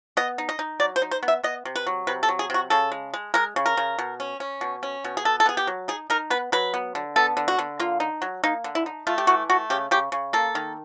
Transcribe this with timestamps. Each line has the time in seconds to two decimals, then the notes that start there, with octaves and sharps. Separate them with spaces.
0.17 B3 D#5
0.38 D#4
0.49 D#5
0.59 D#4
0.80 F#3 D5
0.96 C5
1.02 D#4
1.11 C5
1.23 B3
1.28 E5
1.43 B3 D#5
1.65 C3
1.76 B4
1.87 F#3
2.07 C3 B4
2.23 A4
2.29 F#3
2.39 G#4
2.50 C3 F#4
2.70 C#3 A4
2.92 G#3
3.14 G#3
3.34 G#3 A#4
3.56 C#3
3.66 A#4
3.77 C#3
3.98 B2
4.20 C#4
4.40 C#4
4.61 B2
4.83 C#4
5.04 B2
5.17 G#4
5.25 B3 A4
5.40 A4
5.46 B3 G#4
5.57 G4
5.67 F#3
5.88 D#4 G#4
6.10 D#4 A#4
6.30 B3 B4
6.52 F#3 B4
6.74 B3
6.95 D3
7.16 B3 A4
7.37 D3
7.48 F#4
7.59 D3
7.79 A#3 F4
8.00 D#4
8.22 F#3
8.44 A#3 D#4
8.64 D3
8.75 E4
8.86 D#4
9.07 A3 F4
9.18 G4
9.27 E3 F#4
9.50 A3 F#4
9.70 C#3 G4
9.91 C#3 G4
10.12 C#3
10.33 A#3 A4
10.55 D#3